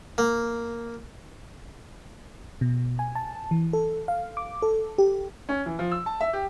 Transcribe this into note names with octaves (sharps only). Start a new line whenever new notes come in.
A#3
B2
G#5
A5
E3
A4
F5
D6
A4
G4
C#4
E3
F3
E6
A5
E5
G4